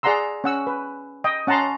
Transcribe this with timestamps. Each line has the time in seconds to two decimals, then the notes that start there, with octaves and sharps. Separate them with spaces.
0.03 G#4 D5 F#5 A#5 C6 E6
0.44 C#4 F#5 E6
0.67 B4
1.24 D#5 G5
1.47 C#4 F#5 A5 A#5 C6